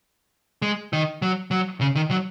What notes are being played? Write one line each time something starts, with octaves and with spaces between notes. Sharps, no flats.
G#3
D#3
F#3
F#3
C#3
D#3
F#3